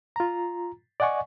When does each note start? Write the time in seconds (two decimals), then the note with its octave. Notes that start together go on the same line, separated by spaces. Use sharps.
0.16 F4 A#5
1.00 D5 D#5 F#5 G#5 C#6